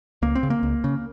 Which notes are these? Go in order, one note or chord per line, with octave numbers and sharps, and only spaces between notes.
C#2 A#3
C4
C#3
A#3
C#2
C#3